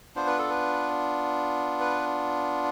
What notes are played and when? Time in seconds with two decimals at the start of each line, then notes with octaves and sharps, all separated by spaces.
0.16 B3 D4 F4 C5
0.27 B4
0.38 A4
0.50 B4
1.81 B4